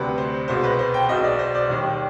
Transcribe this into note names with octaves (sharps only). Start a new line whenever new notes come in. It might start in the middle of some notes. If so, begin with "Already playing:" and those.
Already playing: D2 C3 G3 B4
C5
C2 B2 G#3 C5
B4
C5
G5
B1 B2 G#3 D#5
D5
C5
D5
D#2 D#3 G3